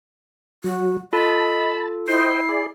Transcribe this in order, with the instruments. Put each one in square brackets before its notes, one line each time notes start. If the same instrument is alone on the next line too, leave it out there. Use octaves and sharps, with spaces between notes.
[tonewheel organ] F#3 [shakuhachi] F#4
[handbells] F4 A4 [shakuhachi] D#5 [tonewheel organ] A5 [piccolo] B5
[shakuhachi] E4 [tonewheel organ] C5 D#5 G5 [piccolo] C7
[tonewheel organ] G#4 D5